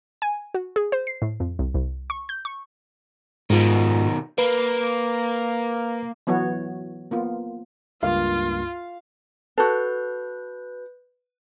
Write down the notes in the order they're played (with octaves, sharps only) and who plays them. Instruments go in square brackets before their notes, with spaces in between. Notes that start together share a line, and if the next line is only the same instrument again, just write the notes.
[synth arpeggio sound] G#5
F#4
G#4
C5
C7
A2
F2
C2
C2
C#6
G6
C#6
[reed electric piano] G#2 F4 [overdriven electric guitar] B2 D#3
[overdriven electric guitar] A#3 [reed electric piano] B4
[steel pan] E3 F#3 B3 F#4 C#5
A#3 B3 F4
[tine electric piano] C#2 G2 A#3 [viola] F4 [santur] F5
[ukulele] F#4 A4 [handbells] B4 G6